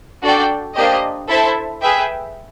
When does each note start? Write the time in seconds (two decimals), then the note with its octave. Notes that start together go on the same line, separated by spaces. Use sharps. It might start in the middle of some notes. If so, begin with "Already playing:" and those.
0.22 D4 F#4 A4 D5 G5
0.75 A#3 D4 G4 C5 D#5
1.28 E4 A4 C5 E5 A5
1.81 G#4 B4 E5 G5